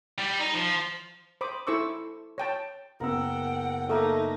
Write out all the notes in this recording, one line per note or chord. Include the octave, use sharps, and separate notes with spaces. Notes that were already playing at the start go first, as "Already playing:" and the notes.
G3
D#4
F3
C5 B5 D6 D#6
E4 A4 C5 C#6 D6 E6
C#5 G5 A5
F#1 B3 A#4 F#5 G5 E6
A3 A#3 D#4 A4 E5